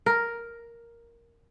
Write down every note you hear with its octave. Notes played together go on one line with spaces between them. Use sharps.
A#4